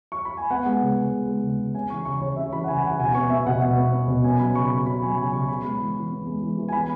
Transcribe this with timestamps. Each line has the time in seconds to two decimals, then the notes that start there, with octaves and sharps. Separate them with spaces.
0.12 C#6
0.25 B5
0.37 G#5
0.50 B3 F#5
0.65 G#3
0.81 C#3
0.97 C#3
1.12 B3
1.28 G#3
1.44 C#3
1.58 C#3
1.75 C#4 G#5
1.90 E3 C#6
2.05 C#3 C#6
2.21 C#3 C#5
2.36 C#4 E5
2.52 E3 B5
2.64 F#5
2.68 C#3 G#5
2.84 C#3 F#5
2.99 B2 G#5
3.15 B3 C#6
3.30 B3 E5
3.46 B2 F#5
3.62 B2
3.78 B3
3.93 B3
4.08 B2
4.24 C#4 G#5
4.39 F#3 B5
4.54 C#3 C#6
4.70 C#3 B5
4.86 C#4 B5
5.02 F#3 G#5
5.17 C#3 G#5
5.33 C#3 C#6
5.48 B3 B5
5.64 G#3
5.80 E3
5.95 E3
6.11 B3
6.27 G#3
6.43 E3
6.58 E3
6.69 G#5
6.73 B3 B5